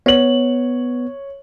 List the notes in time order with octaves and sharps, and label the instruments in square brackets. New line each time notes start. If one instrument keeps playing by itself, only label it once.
[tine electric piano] B3 [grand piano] C#5 F#7